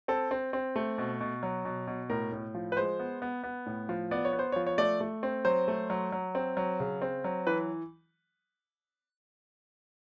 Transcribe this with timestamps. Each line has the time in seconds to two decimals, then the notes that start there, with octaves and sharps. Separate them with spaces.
0.08 C4 A4
0.31 C4
0.53 C4
0.76 A3
0.98 B2
1.21 B2
1.43 F#3
1.65 B2
1.87 B2
2.10 A2 A#4
2.32 A2
2.55 F3
2.72 B4
2.77 G#3 C5
2.99 B3
3.22 B3
3.43 B3
3.66 A2
3.89 F3
4.11 B3 D5
4.25 C#5
4.33 B3
4.39 C5
4.52 C#5
4.56 F3
4.67 C#5
4.78 A3 D5
5.00 A3
5.23 C4
5.45 F#3 C5
5.68 A3
5.90 F#3
6.12 F#3
6.35 C4
6.57 F#3
6.80 C#3
7.02 C4
7.24 F#3
7.47 E3 B4